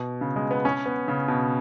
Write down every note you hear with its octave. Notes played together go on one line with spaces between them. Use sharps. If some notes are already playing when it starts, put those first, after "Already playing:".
Already playing: B2
C#3
G#3
B3
C#4
B3
C#3
B2